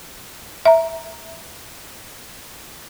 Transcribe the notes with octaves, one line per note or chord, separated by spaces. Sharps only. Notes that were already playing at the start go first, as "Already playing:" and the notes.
E5 A#5